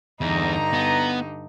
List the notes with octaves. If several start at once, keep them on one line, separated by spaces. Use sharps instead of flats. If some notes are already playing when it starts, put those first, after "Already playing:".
E2 G2 D3 D#4 A#5
B3